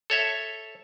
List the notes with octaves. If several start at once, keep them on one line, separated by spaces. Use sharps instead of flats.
A4 C#5 E5